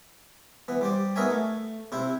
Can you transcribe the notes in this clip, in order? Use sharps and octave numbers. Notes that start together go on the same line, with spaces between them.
E3 B3
G3 C5 D5
B3 D#4 A#4 C#5 E5 G#5
A3
C3 E4 C5